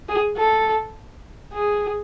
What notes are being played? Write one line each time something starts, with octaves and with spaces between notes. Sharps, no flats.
G#4
A4
G#4